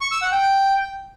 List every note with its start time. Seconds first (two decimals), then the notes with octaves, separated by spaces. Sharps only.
0.01 C#6
0.11 E6
0.22 F#5
0.32 G5